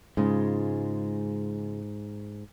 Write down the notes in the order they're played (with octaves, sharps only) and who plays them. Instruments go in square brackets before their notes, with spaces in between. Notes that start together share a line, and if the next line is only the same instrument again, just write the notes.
[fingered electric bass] G#2 [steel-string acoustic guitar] C#3 G#3 F4